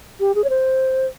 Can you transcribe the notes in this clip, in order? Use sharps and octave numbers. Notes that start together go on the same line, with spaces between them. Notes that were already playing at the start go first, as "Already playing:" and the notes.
G4
G#4
C#5
C5